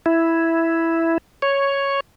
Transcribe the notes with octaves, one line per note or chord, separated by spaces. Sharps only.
E4
C#5